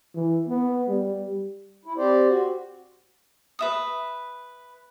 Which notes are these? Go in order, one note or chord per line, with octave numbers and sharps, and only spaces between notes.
E3
B3
G3
E4
C4 G4 C5 D5
F#4
B4 E5 D#6